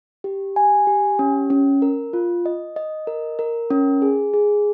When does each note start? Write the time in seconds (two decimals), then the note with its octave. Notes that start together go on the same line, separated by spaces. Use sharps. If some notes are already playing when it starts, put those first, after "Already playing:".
0.24 G4
0.56 G#5
0.87 G4
1.19 C#4
1.50 C#4
1.82 A#4
2.13 F4
2.46 D#5
2.76 D#5
3.07 A#4
3.39 A#4
3.71 C#4
4.02 G#4
4.34 G#4